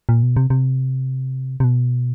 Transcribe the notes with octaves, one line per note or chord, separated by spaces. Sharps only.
A#2
B2
C3
C3
C3
B2